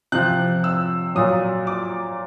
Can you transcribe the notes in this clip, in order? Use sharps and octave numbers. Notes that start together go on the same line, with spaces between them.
C3 F3 F#6
E6
A#2 F#3 D#6
D6